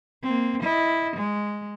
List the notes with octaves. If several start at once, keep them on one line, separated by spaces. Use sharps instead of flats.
A#3 C4
E4 D#5
G#3